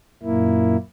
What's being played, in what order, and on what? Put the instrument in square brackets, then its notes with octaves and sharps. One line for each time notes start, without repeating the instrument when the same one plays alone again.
[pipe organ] F#2 A#2 A#3 E4